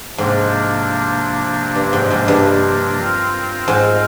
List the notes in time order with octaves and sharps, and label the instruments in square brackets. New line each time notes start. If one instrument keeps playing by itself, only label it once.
[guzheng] G#2 [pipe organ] C3 F3 A#3 D4
[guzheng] G2
G#2
G#2
G2
[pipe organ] C4 F4 A#4
[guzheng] G#2